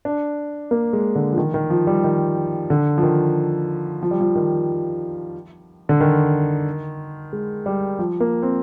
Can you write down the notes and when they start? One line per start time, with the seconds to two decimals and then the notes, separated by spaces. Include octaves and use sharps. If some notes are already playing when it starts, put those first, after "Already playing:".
0.05 D4
0.71 A#3
0.93 G#3
1.15 D3
1.32 F3
1.38 D#3
1.54 D#3
1.70 F3
1.87 G3
2.04 D#3
2.70 D3
2.98 F3
3.03 D#3
4.03 F3
4.11 G3
4.21 F3
4.35 D#3
5.89 D3
6.00 D#3
7.33 G#3
7.66 G3
7.99 F3
8.20 A#3
8.43 C4